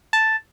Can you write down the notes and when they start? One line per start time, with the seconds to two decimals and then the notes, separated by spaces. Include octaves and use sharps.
0.13 A5